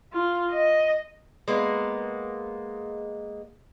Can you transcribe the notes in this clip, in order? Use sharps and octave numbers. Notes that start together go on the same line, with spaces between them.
F4
D#5
G#3 A#3 B3